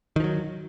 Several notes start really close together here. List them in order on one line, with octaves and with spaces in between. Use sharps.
D#3 F3 F#3